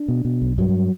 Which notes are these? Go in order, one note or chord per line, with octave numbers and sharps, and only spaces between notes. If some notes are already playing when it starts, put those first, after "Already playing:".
Already playing: D4
B2
B2
B1
G2 F#3